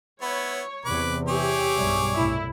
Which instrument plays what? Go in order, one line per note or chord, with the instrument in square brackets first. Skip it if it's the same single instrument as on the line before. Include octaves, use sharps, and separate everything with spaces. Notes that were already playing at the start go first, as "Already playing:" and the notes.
[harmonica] B3 E4 [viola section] C#5
[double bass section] E2 C3 [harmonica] B4 D6
[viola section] G4 E5 [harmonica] G#4 C#5 D6
[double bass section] B1 G2 G3
[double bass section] C2 A2 [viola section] E4